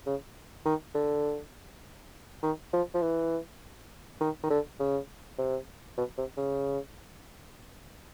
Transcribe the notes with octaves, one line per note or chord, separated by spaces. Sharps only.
C#3
D#3
D3
D#3
F3
F3
E3
D#3
D#3
D3
C#3
C3
B2
C3
C#3